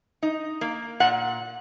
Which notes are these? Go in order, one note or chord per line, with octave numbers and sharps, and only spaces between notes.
D#4
A#3
A#2 F#5